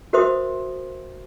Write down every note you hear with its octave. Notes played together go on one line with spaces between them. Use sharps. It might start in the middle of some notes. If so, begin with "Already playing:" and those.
F#4 A#4 C5 E5 C6 D#6